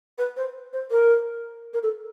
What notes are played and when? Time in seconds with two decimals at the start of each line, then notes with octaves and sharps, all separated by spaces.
0.18 B4
0.37 C5
0.73 C5
0.91 A#4
1.74 A#4
1.83 A4